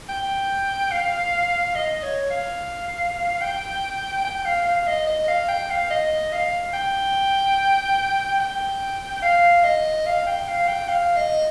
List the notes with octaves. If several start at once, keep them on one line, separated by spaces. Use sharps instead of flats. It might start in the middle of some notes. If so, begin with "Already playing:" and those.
G5
F5
D#5
C#5
F5
G5
G5
F5
F5
D#5
D#5
F5
G5
F5
D#5
F5
G5
G5
F5
D#5
F5
G5
F5
G5
F5
D#5